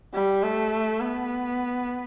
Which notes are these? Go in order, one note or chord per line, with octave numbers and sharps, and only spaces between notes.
G3
A3
B3